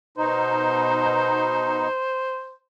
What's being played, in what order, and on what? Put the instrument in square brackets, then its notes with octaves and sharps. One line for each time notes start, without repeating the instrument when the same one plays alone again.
[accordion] B2 D#4 [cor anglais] C5